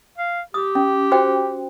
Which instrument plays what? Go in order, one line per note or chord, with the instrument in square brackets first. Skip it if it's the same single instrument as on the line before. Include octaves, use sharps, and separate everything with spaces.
[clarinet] F5
[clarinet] G4 [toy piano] D#6
[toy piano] C#4
F#4 C5 G5